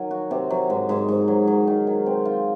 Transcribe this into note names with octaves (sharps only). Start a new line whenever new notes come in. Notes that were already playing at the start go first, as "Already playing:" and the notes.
Already playing: D#3 F#3
F#4
C3
F#3
G#2
G#2
G#2
F#3
F#3
D#3
D#3
C4
F4